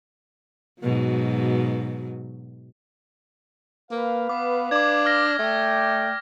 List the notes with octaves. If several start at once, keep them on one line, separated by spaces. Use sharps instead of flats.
G#2 B2 F#3
A#3 B4 F5
B3 D6
D4 D6 G#6
D6 F6 A#6
A3 D5 G5